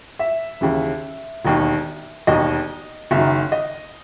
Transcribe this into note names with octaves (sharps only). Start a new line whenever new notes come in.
E5
D#2 C#3 E3
E1 D#2 D#3
E1 D#2 D#3 D#5
F#1 F#2 D#3 E5
D#5